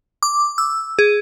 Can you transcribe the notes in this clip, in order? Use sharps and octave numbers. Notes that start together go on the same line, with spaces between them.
D6
E6
G#4